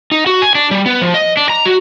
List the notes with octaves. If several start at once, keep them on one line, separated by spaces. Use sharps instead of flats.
D#4
F#4
G#5
D4
G3
B3
F3
D#5
D4
A#5
F#4